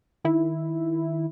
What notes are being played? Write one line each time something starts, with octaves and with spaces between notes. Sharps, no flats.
D#3 E4